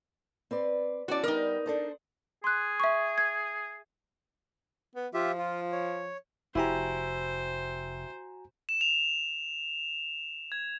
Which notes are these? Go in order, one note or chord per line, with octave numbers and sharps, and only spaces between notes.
C4 B4 D5
E2 C#4 F#4 D5 A5
G3 B3 D#4 A#4
D4 A4 C5
G#4 C6 F#6
E5 C#6
G#6
B3
F3 F4 G4 E5
F4
C#5
F1 E4 F#4 G4 C5 G#5 A#5
E7
F7
G#6